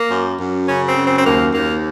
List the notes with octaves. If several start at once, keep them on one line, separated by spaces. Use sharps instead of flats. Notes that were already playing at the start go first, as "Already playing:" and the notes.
Already playing: A#3
F#2
F#2
C#3 C#4
C4
F#2
C4
C4
D#2 A#3
D#2 A#3